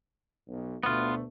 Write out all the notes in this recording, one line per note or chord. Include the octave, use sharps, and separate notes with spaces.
B1
D2 B2 A3 B3 F4